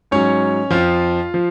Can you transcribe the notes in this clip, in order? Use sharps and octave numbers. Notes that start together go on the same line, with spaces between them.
G#2 F#3 C#4 C#5
F2 F3 F4
F3